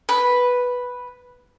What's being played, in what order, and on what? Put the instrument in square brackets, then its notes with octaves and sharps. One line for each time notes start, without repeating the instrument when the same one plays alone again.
[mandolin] B4